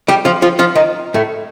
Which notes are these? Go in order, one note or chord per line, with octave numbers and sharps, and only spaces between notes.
G3 G4
F3 F4
F3 F4
F3 F4
D#3 D#4
A2 A3